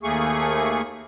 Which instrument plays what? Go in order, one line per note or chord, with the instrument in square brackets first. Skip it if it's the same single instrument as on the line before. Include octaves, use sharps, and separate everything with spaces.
[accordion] D#2 A3 A#3 G#4 C#6